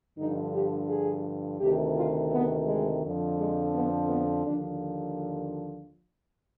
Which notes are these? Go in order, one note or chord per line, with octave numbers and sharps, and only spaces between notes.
G2 D3 F3 D#4
G4
G#4
D2 C3 D#3 G4
F4
B3
G#3
F2 D3 F3
G#3
B3
B3
D#2 D3 F3 D4